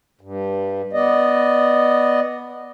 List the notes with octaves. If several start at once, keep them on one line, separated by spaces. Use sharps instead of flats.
G2
B3 D5 D#5